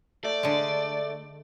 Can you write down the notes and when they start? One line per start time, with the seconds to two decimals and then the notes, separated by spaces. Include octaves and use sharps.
0.24 A3 D5
0.43 D3 G#3